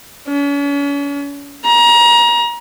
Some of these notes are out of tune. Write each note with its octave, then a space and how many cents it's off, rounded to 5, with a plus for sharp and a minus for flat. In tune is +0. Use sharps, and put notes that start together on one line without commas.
C#4 +40
A#5 +25